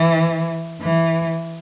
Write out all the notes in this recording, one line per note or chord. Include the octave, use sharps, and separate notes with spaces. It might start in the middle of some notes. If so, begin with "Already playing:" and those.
Already playing: E3
E3